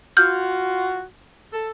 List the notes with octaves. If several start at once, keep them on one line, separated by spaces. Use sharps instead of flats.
F4 F#4 F6 G6
A4